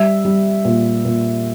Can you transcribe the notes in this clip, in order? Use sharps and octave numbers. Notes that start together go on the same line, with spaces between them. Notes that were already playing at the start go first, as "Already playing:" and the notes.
Already playing: G3 E5
G3
A#2
A#2